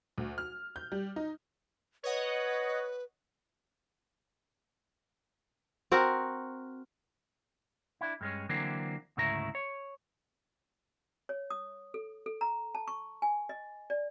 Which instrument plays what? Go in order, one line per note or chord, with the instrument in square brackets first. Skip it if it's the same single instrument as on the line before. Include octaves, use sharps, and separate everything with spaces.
[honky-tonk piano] D2
F6
G6
G3
D#4
[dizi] B4 [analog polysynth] C#5 D#5 F#5
[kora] C4 F#4 A#4
[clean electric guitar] D4 E4
G2 G#3 C#4
D3 E3 F#3 A#3 C4
D2 G#2 C#3 A3 E4 A#5
C#5
[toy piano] C#5
D#6
A4
A4
A#5
A5
C#6
G#5
D#5
D5